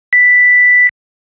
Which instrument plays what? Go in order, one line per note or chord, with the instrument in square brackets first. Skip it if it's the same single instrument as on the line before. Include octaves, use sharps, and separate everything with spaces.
[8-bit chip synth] B6